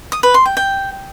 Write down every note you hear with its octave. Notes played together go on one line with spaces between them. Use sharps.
D#6
B4
C6
G5
G5